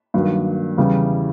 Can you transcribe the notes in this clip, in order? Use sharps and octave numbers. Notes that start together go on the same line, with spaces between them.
G2 D#3 F#3 A#3
E2 C#3 E3 G3